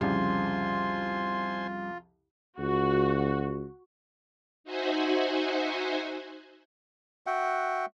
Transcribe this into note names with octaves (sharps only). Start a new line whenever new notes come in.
C2 F2 C#3 G3 F4 C5 G#5 C6
C#2 F#4
D#4 F#4 C5 E5 F#5 G#5
F#4 E5 F#5 G5